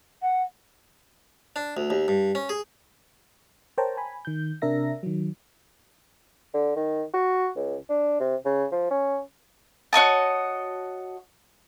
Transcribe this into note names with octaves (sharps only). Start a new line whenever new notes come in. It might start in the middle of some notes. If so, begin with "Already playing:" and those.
F#5
D4
D2
D#2
G2
C#4
G#4
A#4 C5 C#5 G5 A5 A#5
G#5 B5
D#3 G6
C3 D4 A#4 E5 A#6
D#3 F#3
D3
D#3
F#4
C#2
D4
C3
C#3
F3
C#4
F#4 C#5 D#5 A5